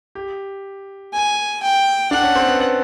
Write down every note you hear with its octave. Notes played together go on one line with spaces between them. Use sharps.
G4
G#5
G5
D4 F#5
C#4
C4
B3
B3